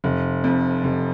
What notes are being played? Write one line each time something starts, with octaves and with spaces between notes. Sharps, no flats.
F1
F2
F1